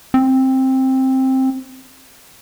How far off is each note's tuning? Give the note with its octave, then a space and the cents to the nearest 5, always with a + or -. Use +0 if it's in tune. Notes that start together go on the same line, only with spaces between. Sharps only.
C4 +10